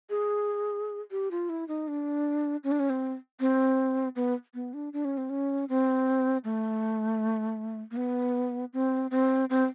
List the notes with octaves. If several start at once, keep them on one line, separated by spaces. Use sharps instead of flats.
G#4
G4
F4
E4
D#4
D4
C#4
D4
C#4
C4
C4
B3
B3
D4
D4
C#4
C4
C#4
C4
A3
A#3
B3
C4
C4
C4